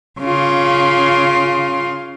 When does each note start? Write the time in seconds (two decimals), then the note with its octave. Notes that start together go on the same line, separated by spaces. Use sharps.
0.19 C#3 F4